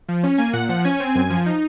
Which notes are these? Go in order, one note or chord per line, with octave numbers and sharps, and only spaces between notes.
F3
C#4
A#3 G#5
A#2 F#5
F3 F#5
C#4 G#5
C4
F#2
F3
D#4